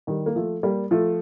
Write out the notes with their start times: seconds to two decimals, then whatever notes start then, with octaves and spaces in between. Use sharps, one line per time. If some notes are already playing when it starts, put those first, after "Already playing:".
0.07 D#3 G3
0.26 A#3
0.36 F3 A3
0.63 G3 A#3
0.91 F3 A3